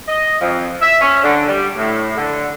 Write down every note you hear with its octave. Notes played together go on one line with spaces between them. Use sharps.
D#5
F2
E5
C#4
D3
G3
A2
D3